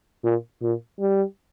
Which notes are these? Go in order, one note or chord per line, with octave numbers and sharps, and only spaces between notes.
A#2
A#2
G3